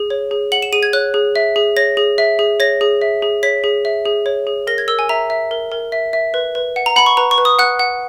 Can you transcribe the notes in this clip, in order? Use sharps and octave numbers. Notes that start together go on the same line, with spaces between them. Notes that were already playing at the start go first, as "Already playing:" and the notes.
Already playing: G#4
C#5
G#4
F#5 F#7
E7
G#4 D#7
G#6
C#5 F#6
G#4
E5
G#4
C#5 A#6
G#4
E5
G#4
C#5 A#6
G#4
E5
G#4
C#5 B6
G#4
E5
G#4
C#5
G#4
A#4 A#6
G#6
A#4 E6
G#5
E5 A#5
E5
A#4
A#4
E5
E5
B4
B4
F#5
A#5
F#5 B5
C#6
B4 A#5
C#6
B4
D#6
F#5 F#6
F#5